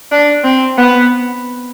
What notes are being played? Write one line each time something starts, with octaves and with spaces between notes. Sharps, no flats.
D4
C4
B3